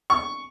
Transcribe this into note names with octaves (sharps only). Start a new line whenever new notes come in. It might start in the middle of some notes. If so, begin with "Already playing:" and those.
C#6